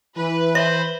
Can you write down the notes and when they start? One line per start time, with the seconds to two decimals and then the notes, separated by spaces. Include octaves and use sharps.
0.16 E3 B4
0.55 C5 E5 B5 C6